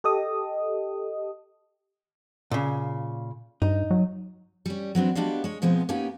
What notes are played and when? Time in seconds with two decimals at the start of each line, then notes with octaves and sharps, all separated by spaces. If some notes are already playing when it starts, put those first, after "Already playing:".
0.04 G4 A4 D#5 D#6
2.51 A#2 C#3
3.62 G2 D#4
3.91 F#3
4.66 G3 C#4
4.95 F#3 B3 C4 D4
5.15 G#3 B3 D4 F#4 G4 F5
5.44 G#3 C#5
5.62 B2 F3 G#3 B3 C4
5.89 A#3 B3 C#4 D#4 G4 G#5